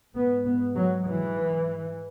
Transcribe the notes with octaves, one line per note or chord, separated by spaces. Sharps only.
G#2 B3
B3
F#3
E3